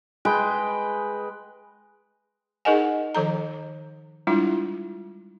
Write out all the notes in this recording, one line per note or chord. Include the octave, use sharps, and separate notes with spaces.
G#3 B4 D#5 G5
D#4 G#4 A#4 D#5 F#5 G#5
D#3 F3 A4 A#5
G3 G#3 D4 E4 F4